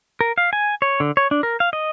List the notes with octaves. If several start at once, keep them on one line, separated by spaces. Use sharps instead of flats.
A#4
F5
G#5
C#5
D3
C#5
D4
A#4
F5
D#5